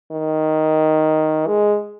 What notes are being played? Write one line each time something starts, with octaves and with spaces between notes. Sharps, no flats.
D#3
G#3